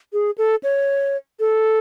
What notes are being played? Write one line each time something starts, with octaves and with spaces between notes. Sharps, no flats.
G#4
A4
C#5
A4